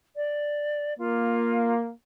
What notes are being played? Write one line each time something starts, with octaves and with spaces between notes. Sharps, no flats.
D5
A#3 F4